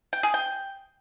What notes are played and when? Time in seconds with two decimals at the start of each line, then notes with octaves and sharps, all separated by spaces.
0.13 G5
0.23 G#4
0.34 G5